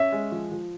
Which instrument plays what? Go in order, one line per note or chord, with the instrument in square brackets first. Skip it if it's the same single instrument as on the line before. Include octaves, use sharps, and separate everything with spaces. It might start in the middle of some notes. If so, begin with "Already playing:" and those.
Already playing: [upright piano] C#4 [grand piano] E5
[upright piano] G#3
F3
F3